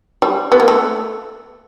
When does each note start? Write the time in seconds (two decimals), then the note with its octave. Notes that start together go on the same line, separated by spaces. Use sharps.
0.22 G3
0.52 B3
0.60 A#3
0.68 A3